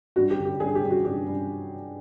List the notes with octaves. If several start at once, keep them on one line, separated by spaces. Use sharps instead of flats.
G2 F#4
G4
D3
G4
G2 G#4
G4
G2
F#4
G2 G4
G2